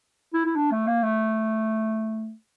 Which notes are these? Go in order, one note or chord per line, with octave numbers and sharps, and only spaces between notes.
E4
E4
D4
A3
A#3
A3